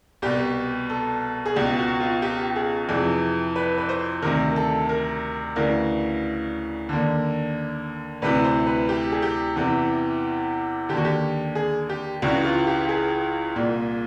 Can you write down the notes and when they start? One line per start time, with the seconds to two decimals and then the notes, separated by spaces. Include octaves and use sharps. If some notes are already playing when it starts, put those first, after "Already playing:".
0.22 C2 B2 G4
0.90 A4
1.46 G#4
1.56 C#2 B2 G4
1.79 F#4
2.00 F4
2.22 G4
2.56 G#4
2.89 F2 C3 E3 G#4
3.56 B4
3.78 B4
3.89 C5
4.22 D2 C3 D#3 A#4
4.56 A4
4.89 A#4
5.56 D2 C#3 E3 A#4
6.89 D#2 D3
8.22 D2 C3 E3 B4
8.44 C5
8.67 B4
8.89 G4
9.12 G#4
9.22 G4
9.56 E2 C3 E3
10.89 D3 G4
10.94 D#2 F#4
11.05 G4
11.55 G#4
11.89 G4
12.22 C#2 C#3 E3 F#4
12.44 F4
12.67 G4
12.89 G#4
13.56 C2 A#2